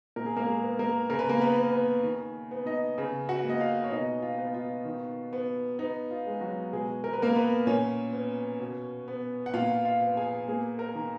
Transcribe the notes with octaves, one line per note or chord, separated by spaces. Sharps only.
A#2 A#4
G#4
A#3 A#4
G#3 G#4
B3
A#3 A#4
C#3 A#4
B4
A#3 A#4
B3 B4
B3
B3 B4
D#3
B3
D#4 D#5
C#3
F#4 F#5
A#3 D#5
F4 F5
C#5
B2 D#4 D#5
F4
B3
F4
D#3
B3
B3 D#4
F4
G#3
F#3 F#4
B2 G#3 G#4
A#4
B4
A#3 B3 A#4
B3 B4
A#2 C#4 C#5
B3
B2
B3
F#5
A#2 F4 F5
F4 F5
B3
G#4 G#5
A#3 G#4 G#5
A#4 A#5
D#3